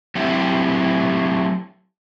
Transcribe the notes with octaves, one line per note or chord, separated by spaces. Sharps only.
F#3 A3 C4 E4 G4